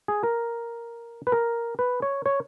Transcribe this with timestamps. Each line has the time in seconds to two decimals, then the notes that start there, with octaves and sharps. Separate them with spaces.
0.08 G#4
0.23 A#4
1.27 B4
1.32 A#4
1.79 B4
2.02 C#5
2.26 C#5